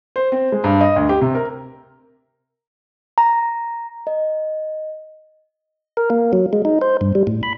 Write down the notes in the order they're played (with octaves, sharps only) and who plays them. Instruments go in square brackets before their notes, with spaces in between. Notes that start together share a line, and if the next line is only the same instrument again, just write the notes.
[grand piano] C5
C4
G#3
G2
D#5
D2
G4
C3
A#4
[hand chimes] A#5
D#5
[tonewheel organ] A#4
A#3
F#3
G#3
D#4
C5
G2
G3
A2
B5